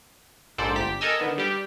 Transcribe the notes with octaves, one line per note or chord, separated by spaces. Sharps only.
A#1 G#2 A4 C5 D5
G1 G4 B6
A4 A#4 D#5 G#5 E6
D3 D#3 B3
G3 G4